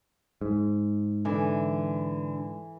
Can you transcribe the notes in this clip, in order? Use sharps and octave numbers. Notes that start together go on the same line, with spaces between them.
G#2
D3 E3